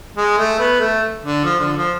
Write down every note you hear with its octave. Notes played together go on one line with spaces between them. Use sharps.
G#3
A3
B3
A3
D3
F3
D3
F3